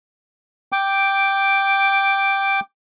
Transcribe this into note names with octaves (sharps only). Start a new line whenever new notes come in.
G5 D6